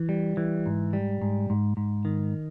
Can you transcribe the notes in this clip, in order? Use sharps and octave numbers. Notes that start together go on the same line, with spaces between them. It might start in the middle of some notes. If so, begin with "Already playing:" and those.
Already playing: E3
G3
E3
G#2
G3
G#2
G#2
G#2
D#3